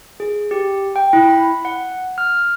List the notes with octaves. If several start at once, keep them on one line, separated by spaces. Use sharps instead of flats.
G#4
G4
G5
E4
B5
F#5
F6